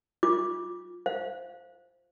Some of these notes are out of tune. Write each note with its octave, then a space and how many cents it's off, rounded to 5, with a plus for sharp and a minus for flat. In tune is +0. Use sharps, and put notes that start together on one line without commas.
F4 +5 D6 +0
C5 +0 F5 +0